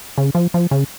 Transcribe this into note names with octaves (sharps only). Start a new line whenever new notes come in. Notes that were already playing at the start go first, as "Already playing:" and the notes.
C#3
F3
F3
C#3